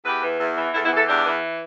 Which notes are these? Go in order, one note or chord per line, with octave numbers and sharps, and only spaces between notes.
E2 G4 B4
E3
E2
E3
E2 E4 A4
B3 E4
E3
E4 A4
E2 D4 G4
E3